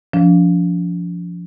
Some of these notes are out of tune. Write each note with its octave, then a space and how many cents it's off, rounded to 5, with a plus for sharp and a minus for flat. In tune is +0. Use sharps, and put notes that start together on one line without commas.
F3 -5 D4 -40